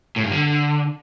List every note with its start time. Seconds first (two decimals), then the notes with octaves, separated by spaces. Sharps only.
0.16 A2
0.24 G2
0.32 D3